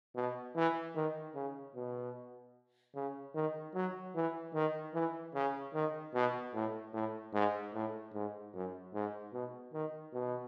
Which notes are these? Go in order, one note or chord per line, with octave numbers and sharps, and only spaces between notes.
B2
E3
D#3
C#3
B2
C#3
D#3
F#3
E3
D#3
E3
C#3
D#3
B2
A2
A2
G#2
A2
G#2
F#2
G#2
B2
D#3
B2